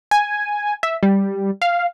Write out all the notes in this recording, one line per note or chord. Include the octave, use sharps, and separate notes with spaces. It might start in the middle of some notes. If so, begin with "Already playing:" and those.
G#5
E5
G3
F5